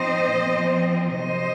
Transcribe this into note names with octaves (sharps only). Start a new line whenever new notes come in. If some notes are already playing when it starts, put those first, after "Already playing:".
Already playing: F3 C4 D#4 C5 D#5
A#2 F3 C4
C3 D#3 F#3 C5 D#5